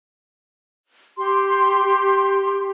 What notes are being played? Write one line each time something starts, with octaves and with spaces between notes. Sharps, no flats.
G4 C6